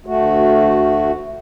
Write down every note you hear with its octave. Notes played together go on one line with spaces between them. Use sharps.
D2 A3 F#4